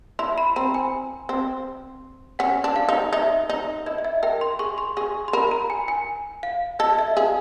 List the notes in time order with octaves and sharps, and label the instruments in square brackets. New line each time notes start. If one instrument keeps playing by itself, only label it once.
[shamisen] E4 [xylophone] C6
[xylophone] B5
[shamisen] C4 [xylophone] A#5
[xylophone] G#5
[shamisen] C4
[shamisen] C#4 [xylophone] F#5
[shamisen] D4
[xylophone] F5
[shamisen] D#4
[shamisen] D#4 [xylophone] E5
[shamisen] D#4
[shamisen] E4 [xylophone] D#5
[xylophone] D#5
E5
[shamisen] A#4 [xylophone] G5
[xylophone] C6
[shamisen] G#4 [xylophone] C#6
[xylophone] C6
[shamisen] G#4 [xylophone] C#6
[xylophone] C6
[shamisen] A#4 [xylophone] B5
[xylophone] A#5
G#5
G#5
F5
[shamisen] A4 [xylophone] D#5
[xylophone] D#5
E5
[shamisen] G#4 [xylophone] F5